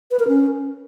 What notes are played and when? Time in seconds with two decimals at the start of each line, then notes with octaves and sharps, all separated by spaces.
0.11 B4
0.19 A#4
0.28 C#4